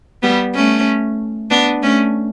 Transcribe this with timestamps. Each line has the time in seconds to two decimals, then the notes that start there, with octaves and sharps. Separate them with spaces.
0.23 G3 B3
0.55 A3 C#4
1.51 B3 D4
1.83 A3 C#4